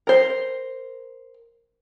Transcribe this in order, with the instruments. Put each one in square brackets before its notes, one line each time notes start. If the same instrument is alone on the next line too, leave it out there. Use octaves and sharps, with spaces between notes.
[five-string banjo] A#4 C5